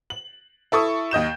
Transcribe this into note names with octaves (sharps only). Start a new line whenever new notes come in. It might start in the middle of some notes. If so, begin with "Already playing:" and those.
F#7
E4 A4 C#6 D#6
D#2 D#5 G6 E7